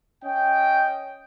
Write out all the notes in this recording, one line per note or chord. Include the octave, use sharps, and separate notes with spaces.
C#4 D#5 G5